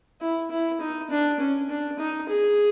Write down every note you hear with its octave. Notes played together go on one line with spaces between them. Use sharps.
E4
E4
D#4
D4
C#4
D4
D#4
G#4